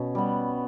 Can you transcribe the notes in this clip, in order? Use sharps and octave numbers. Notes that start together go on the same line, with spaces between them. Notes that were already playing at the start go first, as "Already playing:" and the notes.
Already playing: B2 C#4
G3 B3